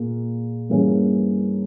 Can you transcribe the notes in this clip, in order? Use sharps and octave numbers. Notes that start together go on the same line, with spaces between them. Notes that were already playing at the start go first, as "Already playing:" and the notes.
Already playing: A#2 A#3 G#4
G2 E3 A#3 C#4 G#4